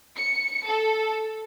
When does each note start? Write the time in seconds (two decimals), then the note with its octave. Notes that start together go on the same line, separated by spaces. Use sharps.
0.17 C#7
0.66 A4